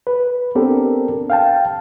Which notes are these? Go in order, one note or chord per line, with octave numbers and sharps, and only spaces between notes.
B4
B3 C4 D4 G4 A4 A#4
F5 G5 A5